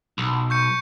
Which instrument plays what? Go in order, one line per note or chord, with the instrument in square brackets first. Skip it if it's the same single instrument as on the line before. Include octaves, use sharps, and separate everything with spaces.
[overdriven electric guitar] B1
[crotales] C#6 G6 C#7